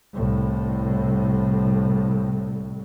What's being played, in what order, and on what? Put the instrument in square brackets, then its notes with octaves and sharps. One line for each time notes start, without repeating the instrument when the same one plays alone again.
[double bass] C2 A2